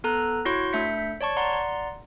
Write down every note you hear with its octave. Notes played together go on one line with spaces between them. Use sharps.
B3 A4 A#5 F#6
E4 F#4 C#5 C6 C#6 G6
A3 D4 E5 G6 B6 C#7
C#5 D5 A5 C#6
D5 F#5 A#5 C6